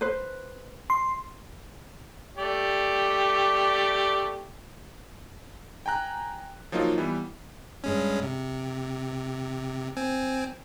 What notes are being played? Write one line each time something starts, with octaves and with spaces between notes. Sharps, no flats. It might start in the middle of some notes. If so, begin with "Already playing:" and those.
B4 C5
C6
A3 G4 D5
G5 G#5 A#5 F#6
F3 F#3 A#3 D#4 F4
E3 G3 B3
G2 G#3 C#4
C3
C4 G#5